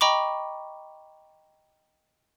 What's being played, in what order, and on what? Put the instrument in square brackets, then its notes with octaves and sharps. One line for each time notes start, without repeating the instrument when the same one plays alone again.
[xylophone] D#5 G5 A#5 B5 C#6 D6